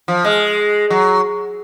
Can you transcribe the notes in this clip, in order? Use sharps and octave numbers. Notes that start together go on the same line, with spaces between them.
F3
G#3
F#3